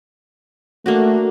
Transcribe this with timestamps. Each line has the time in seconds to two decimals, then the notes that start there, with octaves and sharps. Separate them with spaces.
0.86 A3 A#3 D4 F#4